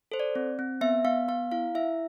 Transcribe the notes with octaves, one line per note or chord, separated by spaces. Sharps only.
A4 C5
D5
C4
C4
B3 E5
B3 F5
B3 F5
E4 F5
E4 E5